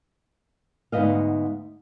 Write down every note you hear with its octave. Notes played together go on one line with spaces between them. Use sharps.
D2 G#2 E3 B3 D#5 F5